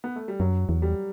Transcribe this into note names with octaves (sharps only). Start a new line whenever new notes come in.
B3
A3
G3
F#2 F#3
E2
G3